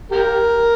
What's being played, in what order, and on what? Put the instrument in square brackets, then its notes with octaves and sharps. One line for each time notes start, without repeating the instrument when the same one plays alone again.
[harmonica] G4 A#4